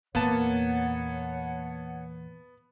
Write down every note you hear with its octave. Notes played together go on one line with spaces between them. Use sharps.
E2 A#2 A#3 B3 C#5 F#5 A5